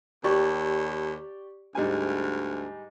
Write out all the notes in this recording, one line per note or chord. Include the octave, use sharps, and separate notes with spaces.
D#2 G4 D5 C#6
D2 G#2 G3 G#5